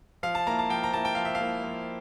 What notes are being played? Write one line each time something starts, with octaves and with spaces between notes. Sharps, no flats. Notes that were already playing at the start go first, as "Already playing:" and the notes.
F3 F5
A5
A#3 E4 A#5
A5
F3 G5
A#5
A#3 E4 A5
G5
F3 F5
E5
F5
A#3 E4
F3